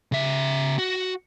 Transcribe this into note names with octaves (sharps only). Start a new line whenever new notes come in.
C#3 E5
F#4